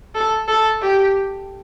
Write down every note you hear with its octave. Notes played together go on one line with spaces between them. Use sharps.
A4
A4
G4